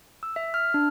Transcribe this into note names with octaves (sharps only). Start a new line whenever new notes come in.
E6
E5
F6
D4